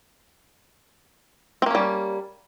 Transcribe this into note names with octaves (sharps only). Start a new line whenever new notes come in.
G3 A#3 C4 C#4